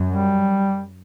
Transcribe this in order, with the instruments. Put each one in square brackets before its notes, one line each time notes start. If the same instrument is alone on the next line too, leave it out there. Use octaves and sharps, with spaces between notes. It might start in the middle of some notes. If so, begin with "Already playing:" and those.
Already playing: [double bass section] F#2
[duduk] G3